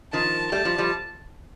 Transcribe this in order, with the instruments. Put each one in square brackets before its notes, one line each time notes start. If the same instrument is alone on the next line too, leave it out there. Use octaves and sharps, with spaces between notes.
[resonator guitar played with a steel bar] D#3 F3 [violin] A5
[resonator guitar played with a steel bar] G3 A3 [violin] A5
[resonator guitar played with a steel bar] F3 G3
F3 G3